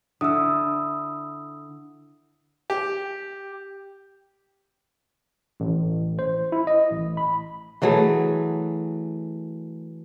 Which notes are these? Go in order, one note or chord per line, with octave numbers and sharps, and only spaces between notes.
D3 E4 D#6 E6
G4
A1
C5
E4
D#5
A1
B5
E3 F#3 A3 G#4